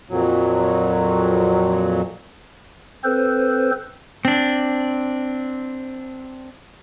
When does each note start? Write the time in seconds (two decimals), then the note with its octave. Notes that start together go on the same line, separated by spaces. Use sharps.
0.10 F2 A#2 F#3
3.04 C4 A4 B4 C5
4.25 C4 D4